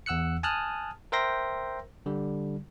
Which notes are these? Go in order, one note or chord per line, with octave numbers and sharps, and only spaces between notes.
E2 F#5 E6 F#6 C#7
G#5 A5 D#6 F6 F#6
A#4 C5 E5 G5 C6 A#6
D3 G3